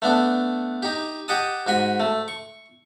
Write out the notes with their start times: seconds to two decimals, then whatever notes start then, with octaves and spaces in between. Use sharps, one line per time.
0.02 A3 B3 D4
0.83 D#4 G4
1.28 G4 D#5 F#5 A5 D#6
1.67 G#2 F#4 G#5 B5
2.00 A3
2.28 C#6